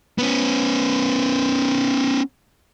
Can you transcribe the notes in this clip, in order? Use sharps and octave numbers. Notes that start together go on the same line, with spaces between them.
B3 C#4